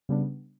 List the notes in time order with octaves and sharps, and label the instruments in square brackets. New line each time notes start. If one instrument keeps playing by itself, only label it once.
[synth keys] C#3 G3 B3 D4